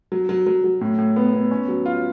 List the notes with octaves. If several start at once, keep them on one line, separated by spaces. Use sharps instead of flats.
F#3
F#3
F#3
F#3
A2
A2
B3
B3
C#4
F#3
F4